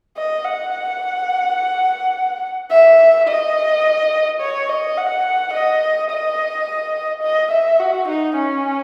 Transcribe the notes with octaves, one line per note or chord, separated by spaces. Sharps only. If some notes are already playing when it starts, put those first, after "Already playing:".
D#5
F#5
E5
D#5
C#5
D#5
F#5
D#5
D#5
D#5
E5
F#4
D#4
C#4